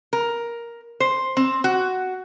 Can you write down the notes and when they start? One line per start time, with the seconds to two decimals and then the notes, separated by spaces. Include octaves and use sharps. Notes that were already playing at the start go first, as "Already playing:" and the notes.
0.13 A#4
1.00 C5
1.37 C4
1.64 F#4